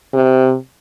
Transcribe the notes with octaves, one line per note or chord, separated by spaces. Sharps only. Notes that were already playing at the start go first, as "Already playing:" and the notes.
C3